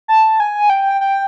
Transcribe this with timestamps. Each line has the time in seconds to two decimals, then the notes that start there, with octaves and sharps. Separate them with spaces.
0.08 A5
0.40 G#5
0.70 G5
1.01 G5